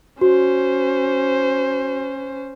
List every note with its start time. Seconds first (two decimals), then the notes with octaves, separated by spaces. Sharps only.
0.21 C#4 F#4 C5